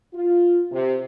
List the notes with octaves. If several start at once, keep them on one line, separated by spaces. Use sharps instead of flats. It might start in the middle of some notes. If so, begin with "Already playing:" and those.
F4
C3